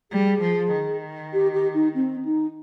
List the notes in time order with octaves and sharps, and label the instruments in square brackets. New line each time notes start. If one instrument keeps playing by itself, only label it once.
[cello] G3 [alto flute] G#4
[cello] F3
D#3
[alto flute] G4
G4
D#4
C4
D#4